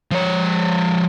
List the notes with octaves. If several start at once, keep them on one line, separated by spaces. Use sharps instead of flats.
F3 C#5